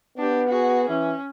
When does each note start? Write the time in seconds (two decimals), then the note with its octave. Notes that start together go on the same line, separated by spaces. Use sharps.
0.17 B3 D4 G4
0.48 F#4 G#4
0.89 E3 C#4